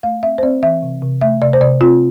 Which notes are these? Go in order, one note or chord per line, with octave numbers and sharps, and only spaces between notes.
A3 F5
C4 E5
C5
C4 D5
E3 E5
C3
C3
A3 E5
C3 D5
C5
C3 D5
C4 F4